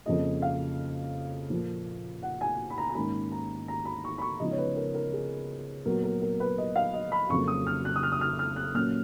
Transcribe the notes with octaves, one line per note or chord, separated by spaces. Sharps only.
F2 C#3 F3 A#3 D#5
F5
A#2 F3 A#3
F#5
G#5
B5
A#5
A#5
G#2 D#3 A#3 C#4 B5
A#5
A#5
B5
C#6
B5
C#6
C#3 F3 G#3 B3 D#4 D#5
C#5
B4
A#4
A#4
G#4
A#2 F#3 B3 A#4
A#4
A#4
B4
D#5
F5
D#5
B5
F2 C#3 F#3 A#3 C#6
D#6
F6
F#6
D#6
F6
D#6
F6
F6
F#6
A#2 F#3 A#3 C#4 F6